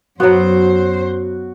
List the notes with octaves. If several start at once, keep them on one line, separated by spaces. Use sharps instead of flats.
F#2 F#3 B3 F#4 C5